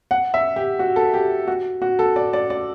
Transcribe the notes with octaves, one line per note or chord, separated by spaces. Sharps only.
F#5
E5
G4
F#4
A4
G4
F#4
F#4
A4
D5
D5
D5